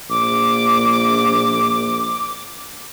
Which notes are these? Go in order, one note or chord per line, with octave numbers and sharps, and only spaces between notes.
A#1 D6